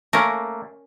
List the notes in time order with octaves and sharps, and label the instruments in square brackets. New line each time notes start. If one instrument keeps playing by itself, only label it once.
[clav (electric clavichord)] A3 A#3 [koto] C#4 A#4